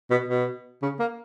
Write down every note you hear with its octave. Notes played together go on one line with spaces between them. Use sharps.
B2
B2
C#3
A#3